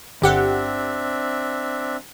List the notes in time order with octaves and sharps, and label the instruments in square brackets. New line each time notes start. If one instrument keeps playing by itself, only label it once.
[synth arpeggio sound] G1 G4 F#5 [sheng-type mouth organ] C4 D4 E5